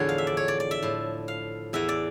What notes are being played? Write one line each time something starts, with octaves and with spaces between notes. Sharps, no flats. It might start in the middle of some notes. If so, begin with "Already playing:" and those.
Already playing: E2 A2 D3 F3 C#5
F5
E5
D5
C#5
D5
D5
E5
A2 F3
F5
E2 E3 E5
D5